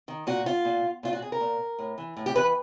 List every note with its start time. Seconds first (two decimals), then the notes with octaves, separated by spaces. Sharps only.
0.08 D#3
0.27 A#2 F#4
0.46 F4
0.65 A#2
1.03 A#2 F4
1.13 F#4
1.22 G#4
1.32 A#4
1.41 A#2
1.79 A2
1.98 E3
2.17 A2
2.26 G4
2.36 E3 B4